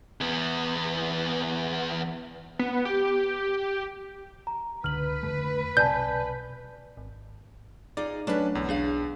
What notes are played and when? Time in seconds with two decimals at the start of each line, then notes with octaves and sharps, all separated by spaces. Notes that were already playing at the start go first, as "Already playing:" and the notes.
0.21 E2 B3
2.59 B3
2.85 G4
4.47 A#5
4.84 C#2 D3 B4 F6 F#7
5.23 F2 D3 A3
5.77 B1 C3 D5 G#5 A5 G6
6.97 G#1
7.97 D#4 F4 G#4 D5
8.27 F#3 A3 C#4 D4 B4 A5
8.55 B1 E2
8.69 D4 G#4 F5